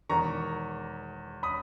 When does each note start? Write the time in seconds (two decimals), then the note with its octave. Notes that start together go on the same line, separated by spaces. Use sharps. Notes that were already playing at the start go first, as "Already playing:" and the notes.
0.09 E1 E2 D#3 A#5 C#6
1.43 B5 D#6